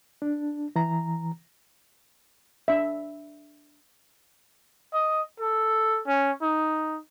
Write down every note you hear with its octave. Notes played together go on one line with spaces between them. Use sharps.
D4
E3 A#5
D4 E5
D#5
A4
C#4
D#4